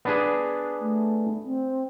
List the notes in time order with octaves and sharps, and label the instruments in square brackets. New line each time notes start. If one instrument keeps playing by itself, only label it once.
[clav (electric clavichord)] B3 D4 G#4
[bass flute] A3
C4